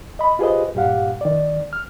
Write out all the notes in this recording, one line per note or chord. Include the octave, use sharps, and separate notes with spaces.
D#5 B5
F4 G4 G#4 B4 C5 D#5
G2 A#2 G4 F5 F#5
D#3 D5
F6